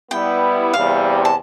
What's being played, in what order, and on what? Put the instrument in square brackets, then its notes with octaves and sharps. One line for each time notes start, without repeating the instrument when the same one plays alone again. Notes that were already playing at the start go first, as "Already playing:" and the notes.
[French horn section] G3 B3 E4 [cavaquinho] G5
[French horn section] E2 C3 G3 [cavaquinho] F5
[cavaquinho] A5